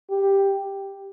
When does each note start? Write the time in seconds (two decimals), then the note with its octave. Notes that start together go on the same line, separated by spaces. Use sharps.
0.10 G4